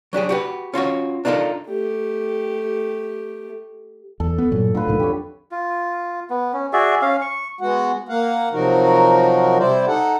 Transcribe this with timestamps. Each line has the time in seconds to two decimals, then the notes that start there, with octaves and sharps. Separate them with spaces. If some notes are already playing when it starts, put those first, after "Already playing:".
0.13 F#3 D4 G4 G#4
0.29 F#4 G4 B4
0.74 C#4 F4 F#4 C#5
1.25 D4 D#4 F4 A4 A#4
1.68 A3 G4
4.20 E2 A4
4.38 B3
4.51 G2 A#2 F#3
4.75 A2 D3 F4 B4
4.87 B1 A2 D#3
5.00 F2 G4 C#5
5.51 F4
6.30 B3
6.53 C#4
6.73 F#4 G#4 D5 E5
7.02 C#4 F5
7.21 C#6
7.61 G#3 B3 F#4 F#5
8.09 A#3 F5 F#5
8.53 C3 F3 F#3 D#4 F#4 A#4
9.59 C3 G3 E4 C5 D5
9.87 D#4 A4 F#5